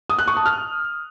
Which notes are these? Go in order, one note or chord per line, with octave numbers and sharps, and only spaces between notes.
D#6
F#6
C#6
A5
F6